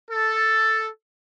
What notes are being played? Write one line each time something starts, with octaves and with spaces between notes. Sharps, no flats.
A4